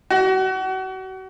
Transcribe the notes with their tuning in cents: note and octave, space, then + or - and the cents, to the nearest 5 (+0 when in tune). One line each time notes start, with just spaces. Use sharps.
F#4 +35